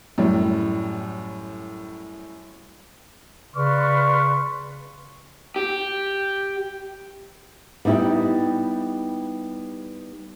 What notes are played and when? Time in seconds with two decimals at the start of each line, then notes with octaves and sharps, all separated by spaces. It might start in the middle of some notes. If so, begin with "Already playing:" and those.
0.18 F#2 A2 G3
3.56 C#3 B4 D5 C6 C#6 F6
5.56 G4
7.85 G3 B3 D#4 E4 G4